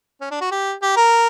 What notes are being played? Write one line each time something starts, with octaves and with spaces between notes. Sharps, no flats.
C#4
D4
F#4
G4
G4
A#4